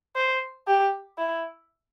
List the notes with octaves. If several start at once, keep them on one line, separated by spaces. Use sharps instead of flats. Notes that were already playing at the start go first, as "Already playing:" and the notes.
C5
G4
E4